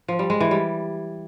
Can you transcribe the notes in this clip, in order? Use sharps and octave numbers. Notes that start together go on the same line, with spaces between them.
F3
G3
G#3
E3
G3